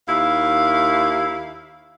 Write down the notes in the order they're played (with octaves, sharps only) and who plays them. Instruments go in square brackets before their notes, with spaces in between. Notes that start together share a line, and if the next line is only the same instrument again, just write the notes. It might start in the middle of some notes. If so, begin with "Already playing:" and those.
[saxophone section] D#2 E4 F5